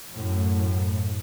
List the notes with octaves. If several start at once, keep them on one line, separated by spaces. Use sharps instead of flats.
F#2 A2